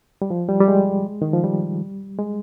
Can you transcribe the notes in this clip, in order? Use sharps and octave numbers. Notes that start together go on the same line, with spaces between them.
G3
F3
G3
G3
G#3
D#3
F3
G3
G#3